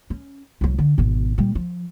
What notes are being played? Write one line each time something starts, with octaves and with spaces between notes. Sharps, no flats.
C#4
C2 F#3
D3
G#1 B2
A#2 G3
F3